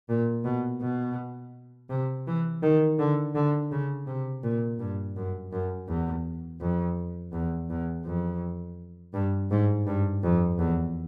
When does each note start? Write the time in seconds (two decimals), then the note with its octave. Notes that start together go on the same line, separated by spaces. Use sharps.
0.09 A#2
0.44 B2
0.81 B2
1.90 C3
2.26 E3
2.62 D#3
2.98 D3
3.35 D3
3.71 C#3
4.07 C3
4.43 A#2
4.79 G2
5.16 F#2
5.52 F#2
5.88 E2
6.61 F2
7.33 E2
7.70 E2
8.05 F2
9.14 G2
9.51 G#2
9.86 G2
10.23 F2
10.59 E2